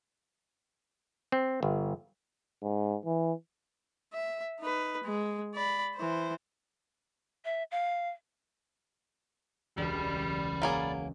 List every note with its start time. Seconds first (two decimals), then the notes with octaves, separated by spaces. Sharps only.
1.32 C4
1.63 G1
2.62 G#2
3.05 E3
4.13 E5
4.60 D#4 B4
5.04 G#3
5.54 D5 B5
5.96 E3 C5
7.45 E5
7.71 F5
9.78 E1 C#2 G3 D5 B5
10.62 F#3 A#3 G#4